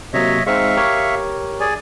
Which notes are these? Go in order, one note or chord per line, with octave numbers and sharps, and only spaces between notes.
C3 F#3 A#3 C#5 D#5 E5
G#3 C4 D#4 E5 F5 C#6
G4 A#4 C#5
G#4 D5 G#5